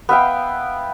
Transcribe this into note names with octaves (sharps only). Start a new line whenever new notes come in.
B3 E5 F5 G5